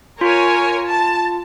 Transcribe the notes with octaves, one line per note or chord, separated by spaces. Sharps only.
F4 A#4 C#5 G#5
A5